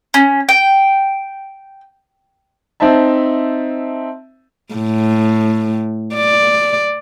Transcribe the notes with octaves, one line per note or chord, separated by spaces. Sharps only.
C#4
G5
C4 D#4 C5 E5 A5
A2
D5